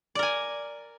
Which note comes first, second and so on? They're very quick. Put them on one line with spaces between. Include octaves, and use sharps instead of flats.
D5 A#4 G#5